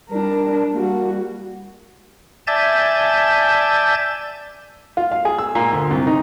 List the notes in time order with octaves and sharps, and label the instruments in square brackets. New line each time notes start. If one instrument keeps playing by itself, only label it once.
[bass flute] G3 [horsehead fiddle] D4 A#4
[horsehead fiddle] G3 F#4 [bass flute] A#3
[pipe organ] D5 E5 G#5 A5 G6 A6
[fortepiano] F4
F5
G#4
E6
A#2
D2
C2
D#4